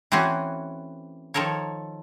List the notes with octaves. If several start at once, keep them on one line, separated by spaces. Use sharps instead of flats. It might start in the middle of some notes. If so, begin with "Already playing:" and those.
E3 A3 C4 C#4 F#4
D#3 F3 A4 A#4 C#5